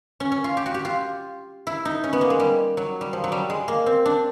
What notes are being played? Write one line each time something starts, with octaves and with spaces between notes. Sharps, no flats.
C#4
C#4
F4
G4
F#4
G4
F4
E4
D#4
C#4
B3
A#3
G#3
G3
F#3
G3
F3
F#3
G3
G#3
A#3
C4
D4